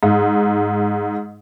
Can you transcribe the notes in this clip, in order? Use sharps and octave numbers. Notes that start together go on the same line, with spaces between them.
G#2